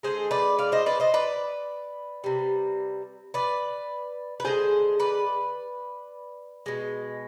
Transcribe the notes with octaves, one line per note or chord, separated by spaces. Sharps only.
D3 G#3 G#4 C5
B4 D5
D5 F5
C5 D#5
B4 D5
C5 D#5
B4 D5
C3 G3
B4 D5
B4
D3 G#3 G#4 C5
B4 D5
B2 G#3